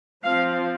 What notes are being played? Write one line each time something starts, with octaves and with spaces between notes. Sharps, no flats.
F3 C4 F5